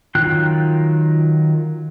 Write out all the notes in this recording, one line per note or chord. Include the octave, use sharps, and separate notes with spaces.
D#3 F#3 F4 G5 F#6